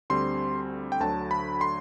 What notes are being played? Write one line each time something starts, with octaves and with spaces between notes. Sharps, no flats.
D2 D3 G3 C4 C6
G5
D2 D3 F#3 A5
B5
C6